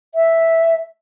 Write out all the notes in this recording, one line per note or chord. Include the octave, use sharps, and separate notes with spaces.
E5